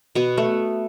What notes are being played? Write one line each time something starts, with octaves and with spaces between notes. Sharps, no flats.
B2 B3
A3